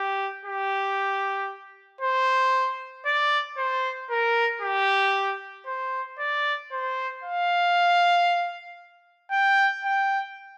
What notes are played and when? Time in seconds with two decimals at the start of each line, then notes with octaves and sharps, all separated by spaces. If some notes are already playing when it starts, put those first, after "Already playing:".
Already playing: G4
0.45 G4
2.01 C5
3.06 D5
3.58 C5
4.11 A#4
4.62 G4
5.67 C5
6.19 D5
6.72 C5
7.24 F5
9.32 G5
9.85 G5